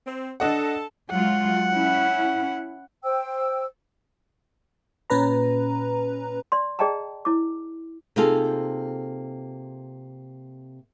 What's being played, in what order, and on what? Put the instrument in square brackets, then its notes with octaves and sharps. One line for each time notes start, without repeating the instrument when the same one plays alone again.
[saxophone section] C4
[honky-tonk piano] D4 D#5 F#5 [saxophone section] A4
[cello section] F#3 G#3 F4 [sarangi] F#5
[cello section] C#4 E4
[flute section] C5 G5 E6
[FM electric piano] A#2 C#4 B4 A#5
[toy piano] D5 C6
G#4 D5 D#5 G5 A5 A#5
E4 D6
[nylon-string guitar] C3 A#3 D#4 F4 G#4 A4